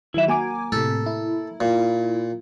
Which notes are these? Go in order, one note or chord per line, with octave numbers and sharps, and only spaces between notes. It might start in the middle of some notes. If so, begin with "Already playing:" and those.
D#3 F#3 E4 E5
A#3 F#4 G#5 D6
A2 C3 A4
E4
A#2